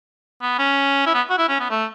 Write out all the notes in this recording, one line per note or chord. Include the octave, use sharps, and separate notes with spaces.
B3
C#4
E4
B3
F#4
E4
C#4
B3
A3